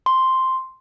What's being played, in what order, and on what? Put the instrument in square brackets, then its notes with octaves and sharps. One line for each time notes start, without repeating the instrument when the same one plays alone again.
[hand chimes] C6